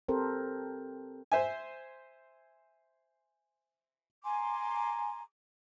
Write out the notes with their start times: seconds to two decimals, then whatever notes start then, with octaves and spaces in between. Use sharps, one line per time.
0.08 C4 G4 A4 A#4 C5
1.32 C5 E5 G#5
4.24 G#5 A#5 C6 D6